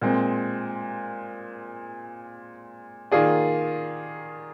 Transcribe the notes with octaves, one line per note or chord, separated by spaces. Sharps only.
A#2 G#3 C4
D#3 A#3 F4 G#4 D5